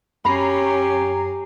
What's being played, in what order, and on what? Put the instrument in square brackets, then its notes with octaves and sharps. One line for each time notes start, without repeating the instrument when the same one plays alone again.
[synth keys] F#2 A#5 C7 [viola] C#4 [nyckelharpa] G4 G#5 [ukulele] B5